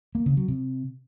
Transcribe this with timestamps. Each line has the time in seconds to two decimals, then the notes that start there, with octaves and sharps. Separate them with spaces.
0.15 A#3
0.26 C#3
0.37 F#3
0.48 C3